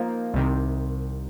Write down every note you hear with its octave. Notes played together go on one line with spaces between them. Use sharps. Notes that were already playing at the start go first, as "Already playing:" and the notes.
Already playing: F3 A#3 D#4
C2 C3 D#3